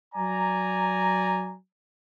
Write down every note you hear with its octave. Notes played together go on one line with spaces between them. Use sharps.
F#3 D5 G#5 A#5